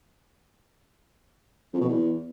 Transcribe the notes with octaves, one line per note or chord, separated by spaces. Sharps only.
F2
B2
E2